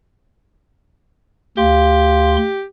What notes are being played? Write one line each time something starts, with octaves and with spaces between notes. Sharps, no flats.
D2 G4 F5 C6